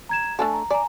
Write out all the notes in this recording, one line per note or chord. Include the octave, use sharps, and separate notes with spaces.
A#5 G#6 E7
A3 D4 A4 G#5
A#5
D5 G#5 A#5